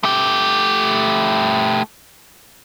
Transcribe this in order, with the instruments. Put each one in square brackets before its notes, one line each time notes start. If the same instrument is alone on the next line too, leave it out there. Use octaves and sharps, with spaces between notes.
[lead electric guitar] A3 G4